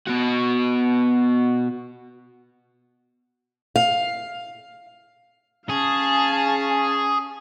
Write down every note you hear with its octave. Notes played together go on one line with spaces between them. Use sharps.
B2 F#4
F5
C#4 G#4 F5 A5